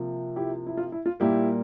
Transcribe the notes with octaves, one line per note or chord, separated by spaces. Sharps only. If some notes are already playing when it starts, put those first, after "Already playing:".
Already playing: C3 F3 A#3
E4 G4
E4
F4
E4
F4
A#2 G3 A#3 E4 G4